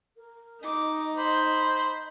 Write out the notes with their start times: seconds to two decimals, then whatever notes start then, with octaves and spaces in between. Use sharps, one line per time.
0.16 A#4
0.62 D#4 D#5 D6
1.17 C5 B5